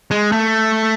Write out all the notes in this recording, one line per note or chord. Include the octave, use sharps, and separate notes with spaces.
G#3
A3